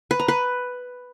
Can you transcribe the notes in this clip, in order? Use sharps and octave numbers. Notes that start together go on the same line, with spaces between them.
B4
A#5
B4